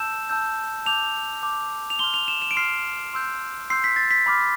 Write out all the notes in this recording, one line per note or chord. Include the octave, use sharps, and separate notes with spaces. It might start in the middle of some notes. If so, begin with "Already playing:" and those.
Already playing: A5 E6 G6 E7
A5 E6 G6
A5 D6 G6 F7
A5 D6 G6
F7
C6 F6 G7
F7
E7
E7
D7
C6 F6 C7
C6 E6 G6
C6 E6 G6 C7
B6
A6
B6
B5 D6 F6